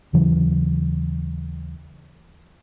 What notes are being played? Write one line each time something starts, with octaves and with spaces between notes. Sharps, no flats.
D#2 C#3 E3 F#3